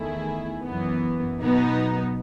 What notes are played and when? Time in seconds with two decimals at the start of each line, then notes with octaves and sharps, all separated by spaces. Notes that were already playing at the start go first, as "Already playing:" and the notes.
Already playing: E2 D#3 A3 E4 G#4
0.64 F#2 E3 B3
1.39 B2 F#3 B3 D#4